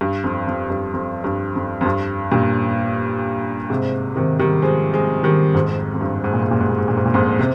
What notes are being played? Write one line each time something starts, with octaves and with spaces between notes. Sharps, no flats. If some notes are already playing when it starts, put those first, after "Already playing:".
G2
F2
F2
G2
F2
G2
F2
F2
G2
G2 A#2
G#2 C3
C3 D#3
D#3 G3
F3 G#3
F3 G#3
D#3 G3
F2 G#2
F2
G2
G#2
A#2
G#2
A#2
G#2
A#2
G#2
A#2
G#2
A#2
F2 G#2
C3